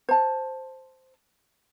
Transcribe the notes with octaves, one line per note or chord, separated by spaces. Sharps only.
C5 A5